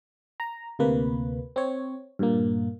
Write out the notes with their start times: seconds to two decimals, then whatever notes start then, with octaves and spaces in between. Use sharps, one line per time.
0.40 A#5
0.79 D2 C3 A#3 B4
1.56 C4 C#5
2.19 G2 A#2 A#3